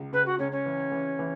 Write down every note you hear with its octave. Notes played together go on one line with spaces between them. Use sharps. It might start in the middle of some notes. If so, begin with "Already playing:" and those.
Already playing: C#2
C#2 B4
F#4
C#2 C#4
C#4
E3
E3
E3